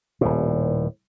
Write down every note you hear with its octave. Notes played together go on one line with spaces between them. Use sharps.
D#1 A2